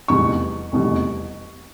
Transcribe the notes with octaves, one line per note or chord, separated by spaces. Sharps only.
F1 E2 B2 G3 C#6
F1 E2 B2 G3